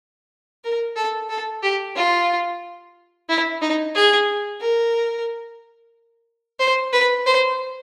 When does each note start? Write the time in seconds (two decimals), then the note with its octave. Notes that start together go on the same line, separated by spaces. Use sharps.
0.64 A#4
0.96 A4
1.29 A4
1.63 G4
1.95 F4
3.29 E4
3.61 D#4
3.95 G#4
4.61 A#4
6.59 C5
6.93 B4
7.26 C5